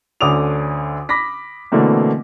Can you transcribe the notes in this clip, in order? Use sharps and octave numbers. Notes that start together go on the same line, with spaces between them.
D2 D3 C#4 D6 D#6 F7
B5 D6 A#6 B6
B2 D3 E3 A3 A#3 C4